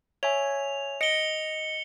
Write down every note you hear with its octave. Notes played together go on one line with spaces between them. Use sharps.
C#5 E5 G#5 F7
D#5 A#6 C#7 D7 G7